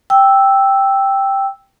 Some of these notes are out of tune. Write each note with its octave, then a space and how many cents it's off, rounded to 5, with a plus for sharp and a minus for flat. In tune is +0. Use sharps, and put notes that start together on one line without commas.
G5 +0 E6 -5